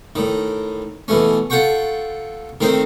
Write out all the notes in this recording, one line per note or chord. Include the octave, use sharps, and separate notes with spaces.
A2 D#3
B2 E3 A3 C#4
F4 A4 F#5 G5 C#6
D#3 A3 C4 D#4 C5